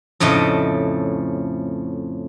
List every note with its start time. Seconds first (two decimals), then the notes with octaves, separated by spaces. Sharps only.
0.20 F2 A2 C#3 A3 D#5